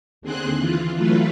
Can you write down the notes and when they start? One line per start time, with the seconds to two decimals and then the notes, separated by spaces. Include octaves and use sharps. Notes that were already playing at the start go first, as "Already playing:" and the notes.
0.22 D#2 D3 C4 G#4 C5 F#6
0.57 E3 F4
0.95 E3 F#3 A3 F4 B4